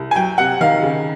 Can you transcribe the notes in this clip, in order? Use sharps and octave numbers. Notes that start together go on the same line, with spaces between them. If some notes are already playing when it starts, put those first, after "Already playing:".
Already playing: C2
G#5
F#3 G5
C3 F#5
D#3 F5
C#3